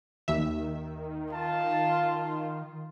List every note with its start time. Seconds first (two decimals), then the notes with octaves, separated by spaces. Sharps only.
0.28 D#2 D#3 E5
1.32 F4 A5